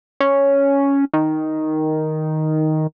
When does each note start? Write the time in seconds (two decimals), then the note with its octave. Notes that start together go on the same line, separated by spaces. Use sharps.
0.20 C#4
1.14 D#3